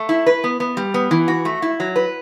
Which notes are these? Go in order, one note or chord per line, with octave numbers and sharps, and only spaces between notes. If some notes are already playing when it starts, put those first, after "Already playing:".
Already playing: A3
E4
B4
B3
B3
G3
B3
E3
F#4
A3
E4
F#3
B4